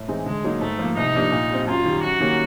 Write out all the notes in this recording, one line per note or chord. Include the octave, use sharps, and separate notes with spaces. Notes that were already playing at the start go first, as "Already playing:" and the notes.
Already playing: A2
E3 G#3 C4 D#4
D3 G#3
F#3 A#3 D#4
G#2 A3
F3 A#3
C2 D#4
C3 F3 A#3 D4
A#2
G3 C4
F#2 F4
D#3 G3
F#2 F#4
D#3 G3 A#3 C#4